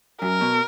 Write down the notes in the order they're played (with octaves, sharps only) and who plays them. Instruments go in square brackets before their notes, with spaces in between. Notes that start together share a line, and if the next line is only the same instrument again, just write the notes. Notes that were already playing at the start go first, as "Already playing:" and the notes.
[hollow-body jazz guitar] F#2 [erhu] A#4
[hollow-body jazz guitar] B2